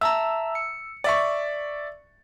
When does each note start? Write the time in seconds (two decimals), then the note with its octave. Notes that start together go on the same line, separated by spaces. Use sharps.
0.01 E5 A5 A#5 E6
0.55 C#7
1.04 D5 E5 C#6